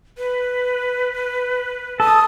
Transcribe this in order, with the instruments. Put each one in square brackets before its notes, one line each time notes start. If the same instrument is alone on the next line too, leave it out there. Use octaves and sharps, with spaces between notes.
[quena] B4
[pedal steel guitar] A4 [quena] D#6